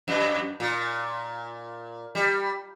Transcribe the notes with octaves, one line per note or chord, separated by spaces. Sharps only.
F#2
A#2
G3